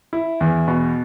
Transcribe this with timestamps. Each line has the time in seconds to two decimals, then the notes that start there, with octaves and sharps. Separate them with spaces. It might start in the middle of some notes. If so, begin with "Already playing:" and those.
0.13 E4
0.41 E2
0.68 B2